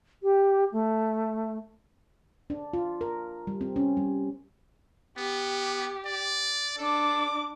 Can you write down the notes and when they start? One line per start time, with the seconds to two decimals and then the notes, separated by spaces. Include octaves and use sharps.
0.23 G4
0.72 A3
2.50 D4
2.73 F4
3.01 A#4
3.47 G3
3.61 C4
3.76 C#4
3.97 G3
5.18 B3 G4
6.06 D5
6.78 D4 A4 D6